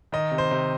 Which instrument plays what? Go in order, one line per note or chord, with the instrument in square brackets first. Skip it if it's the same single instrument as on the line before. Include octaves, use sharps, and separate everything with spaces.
[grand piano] D#3 D#5
C3
C5
C3